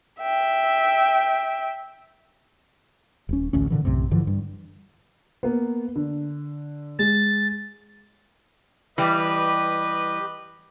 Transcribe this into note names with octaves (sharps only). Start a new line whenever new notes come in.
E5 G5
D#1 C#4
A1 D2 C#4
A#2 D3 E3
B1 F#2 A2 C3
G2 D3 E3 F3
G2
A#3 B3
D3
G#3 A6
E3 G3 G4 B4 D#5